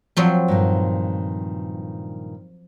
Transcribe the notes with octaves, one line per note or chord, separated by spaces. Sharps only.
F3 F#3 C4
G2 A#2 D#3